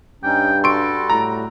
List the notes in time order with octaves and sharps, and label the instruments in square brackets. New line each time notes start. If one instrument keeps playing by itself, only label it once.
[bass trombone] G2 [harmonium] C#4 D#4 [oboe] G5
[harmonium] G3 F#4 [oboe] A4 [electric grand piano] C6 C#6 D7
[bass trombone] A2 [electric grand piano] A#5